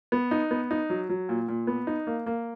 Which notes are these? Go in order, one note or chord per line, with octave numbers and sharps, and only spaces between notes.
B3
D#4
B3
D#4
F#3
F#3
A#2
A#2
B3
D#4
A#3
A#3